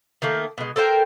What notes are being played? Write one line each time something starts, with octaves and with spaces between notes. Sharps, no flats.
D#3 A3 A#3
B2 G#3
A4 A#4 C5 G5